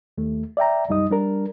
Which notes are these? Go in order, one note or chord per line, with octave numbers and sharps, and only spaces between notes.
D#2 A3
D5 E5 G5 A#5
C2 F#2 G3 D#4 D#5 D#6
G3 D4 A#4